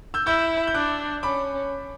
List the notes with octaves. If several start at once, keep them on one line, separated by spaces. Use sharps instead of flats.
E6 G6
E4 E6 G6
G6
D4 D6 F#6
C#4 B5 D6